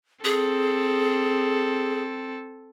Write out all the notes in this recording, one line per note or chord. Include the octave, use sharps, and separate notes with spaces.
C4 G#4 A4